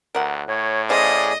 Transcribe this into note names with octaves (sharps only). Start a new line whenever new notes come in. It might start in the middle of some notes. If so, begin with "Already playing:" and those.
D2 A#4 F#5
A2 C#5
C#3 G#4 C5 D5 D#5 F5